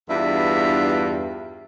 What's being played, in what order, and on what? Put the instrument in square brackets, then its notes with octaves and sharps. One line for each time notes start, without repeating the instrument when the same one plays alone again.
[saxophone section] E2 G2 D4 F4 E5